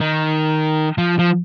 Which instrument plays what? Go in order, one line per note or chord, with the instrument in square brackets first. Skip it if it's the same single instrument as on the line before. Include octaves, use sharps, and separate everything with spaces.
[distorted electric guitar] D#3
F3
F3